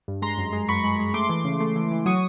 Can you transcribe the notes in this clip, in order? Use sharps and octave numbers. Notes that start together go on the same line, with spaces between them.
G2
G#3 A#5 C6
F#2
G#3
F#2 B5 C#6
G#3
G#3
A3 C6 D6
E3
C#3
A3
E3
E3
F#3 C#6 D#6